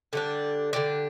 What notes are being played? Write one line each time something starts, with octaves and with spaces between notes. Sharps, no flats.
D3 G3 D4
D3 G3 D4